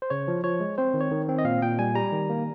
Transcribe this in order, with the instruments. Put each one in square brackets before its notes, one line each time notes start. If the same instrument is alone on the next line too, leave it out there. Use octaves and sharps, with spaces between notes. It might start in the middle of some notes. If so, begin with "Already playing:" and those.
[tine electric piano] C5
C#3 C#5
F3
F3 C#5
G#3
C4 C5
D#3
C#5
D#3
C4
D#5
A#2 F5
A#2 G5
G3 G#5
G3 A#5
D#3
A#3